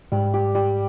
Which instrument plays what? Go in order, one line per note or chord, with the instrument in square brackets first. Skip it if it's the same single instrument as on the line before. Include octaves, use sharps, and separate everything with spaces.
[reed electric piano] G#2 [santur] G3
[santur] G4
G3